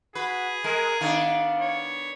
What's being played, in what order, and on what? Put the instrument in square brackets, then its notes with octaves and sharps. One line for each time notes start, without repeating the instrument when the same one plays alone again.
[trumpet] F#4 [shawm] G#4 [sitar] B4
[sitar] G#3 [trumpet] A#4
[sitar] D#3 B3 D4 [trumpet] F5
[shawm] C#5